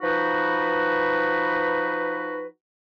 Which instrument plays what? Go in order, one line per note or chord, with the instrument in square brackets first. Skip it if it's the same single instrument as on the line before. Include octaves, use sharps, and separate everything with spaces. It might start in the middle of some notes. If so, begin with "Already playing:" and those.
[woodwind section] F3 D#4 F#4 B4